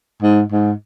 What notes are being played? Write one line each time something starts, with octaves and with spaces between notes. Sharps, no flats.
G#2
G#2